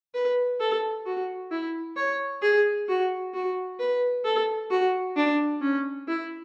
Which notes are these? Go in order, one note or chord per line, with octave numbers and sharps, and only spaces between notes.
B4
A4
F#4
E4
C#5
G#4
F#4
F#4
B4
A4
F#4
D4
C#4
E4